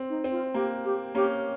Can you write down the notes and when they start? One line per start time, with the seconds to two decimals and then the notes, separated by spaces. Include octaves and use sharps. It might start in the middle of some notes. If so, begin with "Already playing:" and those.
Already playing: C4
0.09 D#4
0.24 C4
0.31 F4
0.54 A#3 G4
0.84 G4
1.15 A#3 C#4 G4